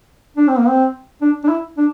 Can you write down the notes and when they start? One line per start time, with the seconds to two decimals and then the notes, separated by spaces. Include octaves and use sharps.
0.37 D4
0.48 C4
0.58 A#3
0.68 C4
1.22 D4
1.44 D4
1.49 E4
1.77 D4